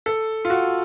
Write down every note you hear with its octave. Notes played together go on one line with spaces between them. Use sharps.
A4
F4
F#4